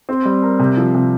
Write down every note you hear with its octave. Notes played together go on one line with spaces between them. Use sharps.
C4
G3
A#4
C3
F3
C3